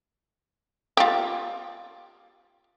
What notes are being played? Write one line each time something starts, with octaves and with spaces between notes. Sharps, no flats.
F4 G4